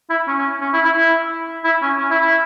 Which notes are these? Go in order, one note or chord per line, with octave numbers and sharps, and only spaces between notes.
E4
C#4
C#4
C#4
E4
E4
E4
E4
C#4
C#4
E4
E4